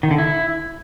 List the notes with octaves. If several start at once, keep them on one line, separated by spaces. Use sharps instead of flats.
D#3
D3
E4